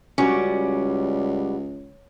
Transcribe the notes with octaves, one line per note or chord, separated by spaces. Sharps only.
C#2 G3 C#4 F#4 D5